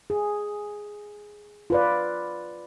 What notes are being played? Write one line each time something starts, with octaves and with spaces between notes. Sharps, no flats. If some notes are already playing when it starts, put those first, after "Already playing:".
G#4
F4 B4 D5